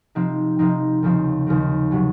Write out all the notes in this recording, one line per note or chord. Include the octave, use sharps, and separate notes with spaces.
C3 F3 C4 D#4
C3 F3 C4 D#4
D#2 C#3 F3 C4
D#2 C#3 F3 C4
C3 F#3 C#4